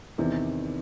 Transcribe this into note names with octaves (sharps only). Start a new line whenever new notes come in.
E2 C3 D#3